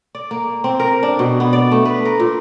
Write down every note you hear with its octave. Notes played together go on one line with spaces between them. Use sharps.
D5
A#3
C4
A#4
D4
B2
B3
D5
A3
B4
A#4
A#2